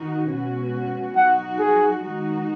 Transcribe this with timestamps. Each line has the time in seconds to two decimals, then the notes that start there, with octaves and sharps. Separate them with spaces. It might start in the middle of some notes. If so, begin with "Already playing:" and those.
Already playing: D#3 D#4 F#4
0.28 B2 G#3 C#4 F#4
1.15 F#3 D#4 F#4 F#5
1.59 G#4
2.03 D#3 G#3 D#4 F#4